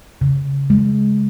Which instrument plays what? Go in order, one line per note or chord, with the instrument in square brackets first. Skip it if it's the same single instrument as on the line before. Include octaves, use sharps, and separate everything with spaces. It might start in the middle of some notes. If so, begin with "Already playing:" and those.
[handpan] C#3
G#3